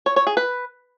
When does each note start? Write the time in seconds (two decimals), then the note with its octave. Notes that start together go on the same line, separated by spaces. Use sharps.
0.06 C#5
0.16 C#5
0.27 G#4
0.37 B4